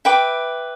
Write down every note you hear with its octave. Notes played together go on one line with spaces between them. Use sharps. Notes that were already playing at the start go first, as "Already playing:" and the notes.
B4 E5 G5 D6